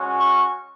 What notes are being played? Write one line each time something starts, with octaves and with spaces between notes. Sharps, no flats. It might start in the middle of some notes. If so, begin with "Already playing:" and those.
Already playing: G#3 C#4 F#4
C#6